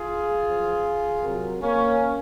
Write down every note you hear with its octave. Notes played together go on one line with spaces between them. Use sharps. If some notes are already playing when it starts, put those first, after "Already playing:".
Already playing: F4 G#4
F#2 F3
C3 F#3 F#4 A#4
A#3 C#4